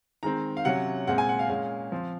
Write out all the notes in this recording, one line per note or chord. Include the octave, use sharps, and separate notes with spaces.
D#3 G#3 C4 A#5
F5
C3 F#3 C#4 F#5
A#2 G#3 C4 F#5
G#5
F#5
F5
A#2 G#3 C#4 F5
F3 C4